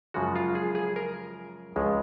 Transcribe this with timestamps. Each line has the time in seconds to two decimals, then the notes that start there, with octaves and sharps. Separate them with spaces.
0.14 F#2 C#3 F3 G#3 F#4
0.36 F4
0.55 G#4
0.75 G#4
0.96 A#4
1.76 C#2 C#3 F3 G#3